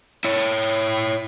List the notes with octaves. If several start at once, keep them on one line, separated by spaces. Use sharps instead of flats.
E4 C#5